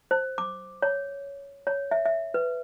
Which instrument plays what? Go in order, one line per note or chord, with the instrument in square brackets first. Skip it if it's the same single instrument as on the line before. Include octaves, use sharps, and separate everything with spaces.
[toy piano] C5
D6
C#5
C#5
E5
E5
B4